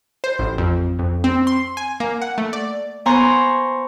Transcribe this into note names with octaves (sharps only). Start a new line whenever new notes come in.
C5
A1
F2
F2
C4
C6
G#5
A#3
F#5
A3
D5
B3 C5 G#5 A#5 C6 C#6